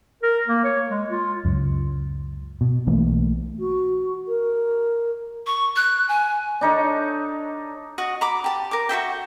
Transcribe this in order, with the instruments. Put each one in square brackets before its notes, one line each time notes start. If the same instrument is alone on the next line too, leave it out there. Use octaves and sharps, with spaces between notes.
[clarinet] A#4
A#3
C#5
G#3
F4
[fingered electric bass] C#2 F#2
B2
B1 E3 A3 A#3
[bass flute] F#4
A#4
[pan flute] C#6
F#6
G#5
[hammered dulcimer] D4 D#4 A4 C#5
[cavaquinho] F#4 D#5 F#5
A#5 B5 D6
G4 A5
A#4 D6
F#4 A4 E5 G5